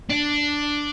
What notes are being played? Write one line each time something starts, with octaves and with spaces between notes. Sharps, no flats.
D4